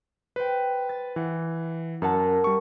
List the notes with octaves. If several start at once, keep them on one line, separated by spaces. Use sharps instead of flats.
B4 C5 G5
A6
E3 F#5
F#2 A#4 F#5 A5
G3 C#6